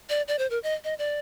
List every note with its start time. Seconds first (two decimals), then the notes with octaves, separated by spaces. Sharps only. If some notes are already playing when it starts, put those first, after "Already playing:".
0.09 D5
0.28 D5
0.39 C5
0.50 A#4
0.63 D#5
0.84 D#5
0.99 D5